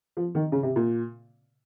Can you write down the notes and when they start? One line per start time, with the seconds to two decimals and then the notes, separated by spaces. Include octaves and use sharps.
0.17 F3
0.35 D#3
0.52 C#3
0.63 C3
0.76 A#2